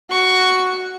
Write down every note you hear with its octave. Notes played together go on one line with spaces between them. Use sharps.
F#4 C#6